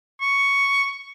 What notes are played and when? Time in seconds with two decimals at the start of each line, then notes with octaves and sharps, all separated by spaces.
0.21 C#6